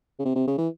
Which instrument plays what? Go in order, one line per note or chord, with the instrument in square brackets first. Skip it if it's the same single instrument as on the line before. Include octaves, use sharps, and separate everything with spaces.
[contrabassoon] C#3
C3
C3
C#3
E3